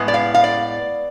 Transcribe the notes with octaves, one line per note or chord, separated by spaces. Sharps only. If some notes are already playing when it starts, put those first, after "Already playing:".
Already playing: A2 G#3 B3
D5
F5
F5
D5